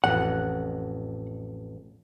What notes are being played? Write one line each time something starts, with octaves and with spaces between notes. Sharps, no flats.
A1 F2 F#5